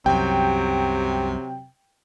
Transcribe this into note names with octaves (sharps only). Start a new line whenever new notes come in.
C2 F#2 C3 F#3 G5